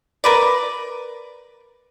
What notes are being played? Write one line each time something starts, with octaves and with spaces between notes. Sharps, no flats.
A#4 B4 D5